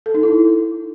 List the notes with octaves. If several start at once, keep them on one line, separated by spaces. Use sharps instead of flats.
A4
D#4
E4